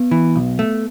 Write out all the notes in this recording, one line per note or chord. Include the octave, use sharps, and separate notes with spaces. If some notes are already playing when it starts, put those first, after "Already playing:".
Already playing: B3
E3
B1
A3